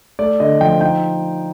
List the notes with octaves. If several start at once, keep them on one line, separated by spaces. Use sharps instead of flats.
A3 D5
D3 D#5
F3 G5
D#4 G5